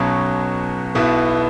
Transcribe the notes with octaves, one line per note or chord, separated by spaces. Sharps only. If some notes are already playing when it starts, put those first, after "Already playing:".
Already playing: B1 B2 F#3 C#4
B1 B2 B3 E4